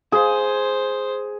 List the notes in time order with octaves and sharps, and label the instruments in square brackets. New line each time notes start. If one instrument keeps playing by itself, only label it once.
[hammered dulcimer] G#4 [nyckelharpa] C5